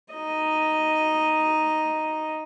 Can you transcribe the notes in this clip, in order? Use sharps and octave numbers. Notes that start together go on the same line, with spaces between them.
D#4 D#5